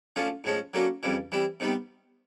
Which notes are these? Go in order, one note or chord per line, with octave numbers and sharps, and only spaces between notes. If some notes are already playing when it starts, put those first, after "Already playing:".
D3 F3 A3 C#4 F4
A2 F3 G#3 C#4
D3 F#3 A#3 C#4 F#4
F2 C#3 E3 G3
E3 G3 C4 E4
C3 D#3 G3 B3